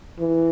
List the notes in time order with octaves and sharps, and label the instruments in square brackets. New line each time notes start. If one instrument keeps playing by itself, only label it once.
[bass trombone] E3